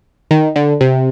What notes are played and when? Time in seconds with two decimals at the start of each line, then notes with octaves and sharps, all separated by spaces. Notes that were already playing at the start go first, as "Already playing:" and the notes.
0.31 D#3
0.56 D3
0.81 C3